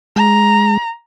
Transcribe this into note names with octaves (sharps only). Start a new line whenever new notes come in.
G#3 A#5